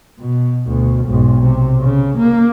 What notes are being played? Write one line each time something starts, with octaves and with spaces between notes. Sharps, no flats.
B2
D2 B2
B1 G#2
C3
C#3
A#3